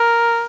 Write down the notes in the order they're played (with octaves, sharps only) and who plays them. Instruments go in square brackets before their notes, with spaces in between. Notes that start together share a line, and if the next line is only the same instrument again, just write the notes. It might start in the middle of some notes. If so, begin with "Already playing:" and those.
Already playing: [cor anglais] A#4